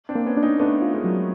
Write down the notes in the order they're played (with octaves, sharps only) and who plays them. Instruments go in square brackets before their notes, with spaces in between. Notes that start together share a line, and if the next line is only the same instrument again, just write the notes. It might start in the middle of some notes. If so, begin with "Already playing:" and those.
[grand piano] C4 D4
[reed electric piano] A#3
[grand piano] B3 C#4
[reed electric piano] D4
[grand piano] C#4 D#4
[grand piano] A3 B3 [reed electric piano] D4
[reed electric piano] F4
[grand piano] G#3 A#3
[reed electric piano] F#3